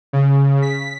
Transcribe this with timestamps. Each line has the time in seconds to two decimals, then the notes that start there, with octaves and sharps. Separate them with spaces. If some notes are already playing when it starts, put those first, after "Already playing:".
0.13 C#3
0.62 B6